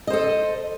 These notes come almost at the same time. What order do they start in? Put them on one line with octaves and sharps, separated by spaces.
D#5 C5 A4